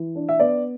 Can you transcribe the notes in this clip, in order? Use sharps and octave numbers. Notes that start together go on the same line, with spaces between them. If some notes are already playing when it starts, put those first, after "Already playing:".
Already playing: E3
D4
E5
B3 D5